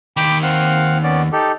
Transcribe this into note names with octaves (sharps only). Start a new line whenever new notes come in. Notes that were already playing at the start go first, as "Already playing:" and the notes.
D#2 D#3 G5 B5 D6
C4 F5 F#5
B3 C#4 D5
D#4 G4 A4